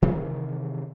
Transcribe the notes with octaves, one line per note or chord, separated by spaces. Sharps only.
C3 D#3 E3